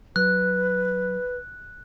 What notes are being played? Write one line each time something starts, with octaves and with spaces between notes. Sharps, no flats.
F#3 B4 F#6